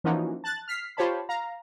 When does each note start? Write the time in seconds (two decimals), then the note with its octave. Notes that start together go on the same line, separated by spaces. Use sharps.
0.04 E3 F3 A#3 C#4 D#4 F#4
0.44 A5 F#6 A6
0.68 F6 B6 C7
0.97 F4 G4 C5 C#5 A5 B5
1.29 F5 A#5